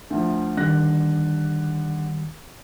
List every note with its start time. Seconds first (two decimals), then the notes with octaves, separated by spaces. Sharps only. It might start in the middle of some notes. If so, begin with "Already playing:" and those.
0.10 D2 F3
0.57 D3 D#3 G3 F#6 A#6